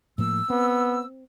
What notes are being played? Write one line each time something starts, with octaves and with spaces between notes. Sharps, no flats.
A2 F3 A#3 E6
B3 C4